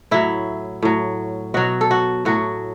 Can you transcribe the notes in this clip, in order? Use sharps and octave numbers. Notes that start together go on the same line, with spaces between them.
A2 F#3 E4
A2 F#3
B2 F#3 F#4
A4
F#4
A2 F#3 F#4